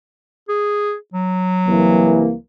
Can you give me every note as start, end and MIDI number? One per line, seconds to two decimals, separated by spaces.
0.49 0.95 68
1.14 2.40 54
1.67 2.33 36
1.67 2.33 52
1.67 2.33 58